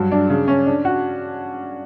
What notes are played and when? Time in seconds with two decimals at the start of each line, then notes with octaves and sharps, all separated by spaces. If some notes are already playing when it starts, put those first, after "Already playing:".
Already playing: G2 F#3
0.12 D4
0.30 C#3
0.48 C#4
0.66 D4
0.85 F#4